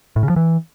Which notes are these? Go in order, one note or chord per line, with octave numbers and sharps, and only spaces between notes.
A2
C#3
F3
E3